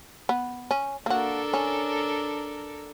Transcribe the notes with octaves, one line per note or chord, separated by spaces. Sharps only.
B3
C#4
A#3 D4 F#4 A4 A#4
C#4